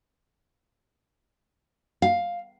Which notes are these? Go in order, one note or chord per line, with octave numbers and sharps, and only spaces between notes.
F5